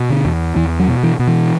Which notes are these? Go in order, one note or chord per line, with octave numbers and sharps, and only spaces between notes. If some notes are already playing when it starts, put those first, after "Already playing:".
Already playing: B2
D3
E2
E2 E3
F#3
B2
E3
B2
E3